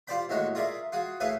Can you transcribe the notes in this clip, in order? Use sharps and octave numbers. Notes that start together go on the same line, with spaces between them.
F4 G4 C5 D5 G5 B5
D#2 A2 G#3 F#4 C#5
F4 G#4 A#4 D5 E5
F4 F#4 G#4
A2 A3 G#4 B4 F5 G#5